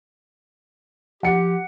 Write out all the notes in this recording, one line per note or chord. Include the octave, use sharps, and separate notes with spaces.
F3 G4 F#5 C#7